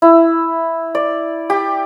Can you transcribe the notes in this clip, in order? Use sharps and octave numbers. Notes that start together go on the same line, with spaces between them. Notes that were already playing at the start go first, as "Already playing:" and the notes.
E4
D5
G4